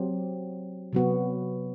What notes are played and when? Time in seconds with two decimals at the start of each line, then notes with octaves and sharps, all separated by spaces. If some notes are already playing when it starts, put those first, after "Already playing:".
Already playing: F#3 C4 G4
0.93 C3 F#3 B3 F#4